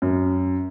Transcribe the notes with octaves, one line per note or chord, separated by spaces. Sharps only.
F#2